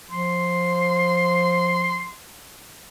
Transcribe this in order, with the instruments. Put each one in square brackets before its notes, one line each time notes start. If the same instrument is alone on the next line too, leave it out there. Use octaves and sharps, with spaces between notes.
[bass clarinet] F3 [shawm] C6